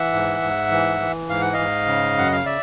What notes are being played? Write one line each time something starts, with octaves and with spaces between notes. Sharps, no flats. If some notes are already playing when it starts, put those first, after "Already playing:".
Already playing: E3 E5 F#5
G#2
G#2
E3
E3
G#2 F5
F#5
D#5 F5
G#2
C#3
F#2 F#5
F5
D5 E5